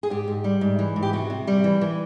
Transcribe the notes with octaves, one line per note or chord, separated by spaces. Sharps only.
G#4
G#2 G4
G#2
G3
G#2
E3
G#2
G4
C3 F#4
C3
G3
E3
E3